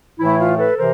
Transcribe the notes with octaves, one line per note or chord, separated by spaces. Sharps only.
A2 E3 A3 E4
F4
A4 B4
C3 E3 A#4 C5